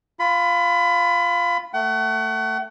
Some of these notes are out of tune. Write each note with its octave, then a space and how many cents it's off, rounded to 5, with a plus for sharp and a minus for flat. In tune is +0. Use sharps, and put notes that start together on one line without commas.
F4 +0 B5 +25
A3 +15 F#5 +35